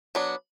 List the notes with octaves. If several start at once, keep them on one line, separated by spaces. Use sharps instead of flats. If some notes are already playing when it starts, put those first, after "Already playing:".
F#3 B3 D4